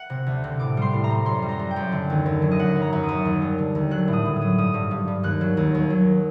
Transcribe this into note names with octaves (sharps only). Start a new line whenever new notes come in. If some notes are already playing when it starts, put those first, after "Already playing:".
Already playing: F#5
C3
D2
C3
A2 D6
G3 C6
A2
A#5
G3
F#2 C6
G3
A#5
G3
G5
F#2
D3
D#2
D#2
F#3
D#5
F#2 F#5
F#2
A#5
F#2
D#6
F#2
D#2
G3
D3
D#2
F#3 F#6
A2
D#6
A2
D#6
F#3
G2 D#6
G2
G2
G2
D#2 F#6
F#3
D#2
D#2
F#3